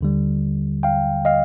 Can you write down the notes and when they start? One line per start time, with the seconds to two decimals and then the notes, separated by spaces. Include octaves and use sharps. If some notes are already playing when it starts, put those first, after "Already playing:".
0.01 D#2 D3 G3
0.83 F5 G5
1.25 D#5 F5